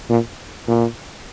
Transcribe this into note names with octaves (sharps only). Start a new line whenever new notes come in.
A#2
A#2